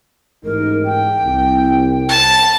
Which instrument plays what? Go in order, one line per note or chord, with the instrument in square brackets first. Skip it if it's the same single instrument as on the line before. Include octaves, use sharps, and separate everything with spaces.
[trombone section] A1 G#2 D#4 [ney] A#4
[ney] G5
[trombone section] C2
[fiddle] A5